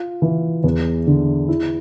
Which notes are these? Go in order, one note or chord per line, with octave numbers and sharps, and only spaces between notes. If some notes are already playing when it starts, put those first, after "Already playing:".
Already playing: F4
E3
E2
D3
E4